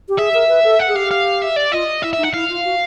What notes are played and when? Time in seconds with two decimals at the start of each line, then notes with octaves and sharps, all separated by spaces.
0.09 G4
0.18 G#4 E5
0.34 A#4
0.49 B4
0.64 A4
0.79 F#5
0.88 G#4
0.95 G4 F5
1.11 F5
1.42 E5
1.56 D5
1.72 F4 D#5
2.03 E4 E5
2.13 D#4 E5
2.23 F#5
2.34 E4 F5
2.50 F4
2.64 F#4